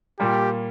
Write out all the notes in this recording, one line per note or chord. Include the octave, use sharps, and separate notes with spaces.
A#2 G3 A#3 G4